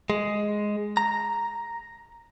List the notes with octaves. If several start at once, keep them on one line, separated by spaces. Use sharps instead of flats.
G#3
A#5